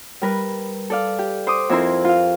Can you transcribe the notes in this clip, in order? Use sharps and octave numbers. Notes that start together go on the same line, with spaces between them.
G3 A#4 B4
A4 D5 F5
G4
C5 D6 D#6
F2 C4 E4 A#4 C6
F4 F5